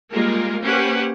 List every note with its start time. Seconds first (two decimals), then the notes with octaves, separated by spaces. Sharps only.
0.12 G3 G#3 A#3 F4 A#4
0.63 A#3 C#4 G4 B4 C5 F#5